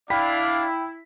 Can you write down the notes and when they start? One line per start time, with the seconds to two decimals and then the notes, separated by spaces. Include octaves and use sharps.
0.10 D4 E4 D5 F5 G5 B5 B6